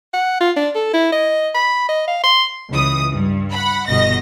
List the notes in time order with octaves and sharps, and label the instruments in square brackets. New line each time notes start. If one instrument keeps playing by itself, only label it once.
[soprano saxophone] F#5
F4
D4
A4
E4
D#5
B5
D#5
F5
C6
[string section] C#2 E3 D#6
G2
F#5 B5
G1 B2 D#5 A#6